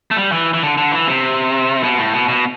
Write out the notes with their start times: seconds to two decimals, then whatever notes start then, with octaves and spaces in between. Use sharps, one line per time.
0.11 A3
0.17 G3
0.32 E3
0.54 E3
0.63 D3
0.78 D3
0.92 E3
1.07 C3
1.83 B2
1.98 A2
2.14 B2
2.28 B2